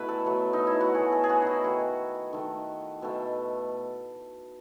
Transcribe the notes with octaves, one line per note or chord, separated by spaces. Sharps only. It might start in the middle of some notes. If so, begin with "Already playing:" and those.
Already playing: B2 A3 E4 B4
A4
B2 F#3 A3
D#4
E4
F#4
B2 F#3 A3 G#4
A4
G#4
F#4
D#4 E4
D#3 A3 F#4
D#3 A3
B2 A3